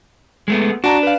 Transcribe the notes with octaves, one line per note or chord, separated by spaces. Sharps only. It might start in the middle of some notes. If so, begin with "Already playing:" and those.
G#3 A3 B3
D4 F#4 A5 A#5
B4 F5